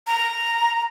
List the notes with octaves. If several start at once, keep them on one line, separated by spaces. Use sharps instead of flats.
A#5